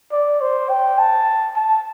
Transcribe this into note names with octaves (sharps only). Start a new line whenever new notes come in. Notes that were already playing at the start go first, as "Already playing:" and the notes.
D5
C5
G5
A5
A5